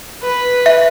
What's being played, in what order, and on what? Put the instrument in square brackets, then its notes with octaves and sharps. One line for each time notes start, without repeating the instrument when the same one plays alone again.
[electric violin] B4
[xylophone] E5